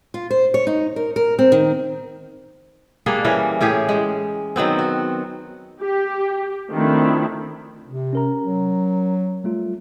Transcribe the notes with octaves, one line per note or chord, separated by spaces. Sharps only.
F4
C5
C#5
D#4
A#4
A#4
C4
D#3
G3 A#3 D4 G#4
E3 G3 C#4 A#4
A2 C#4 G4 G#4
G#3
D#3 F#3 B3 C4
F#4
G4
D#3 F3 A3 C4 D4 E4
C3
C#4 A#4 A#5
F#3
G3 A3 F4